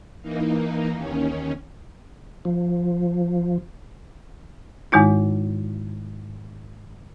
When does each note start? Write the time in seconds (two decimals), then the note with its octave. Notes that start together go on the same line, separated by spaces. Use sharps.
0.22 E3 A#3 D#4
0.92 D#2 D#3 C#4
2.45 F3
4.92 G#2 D#3 G#3 D#4 E4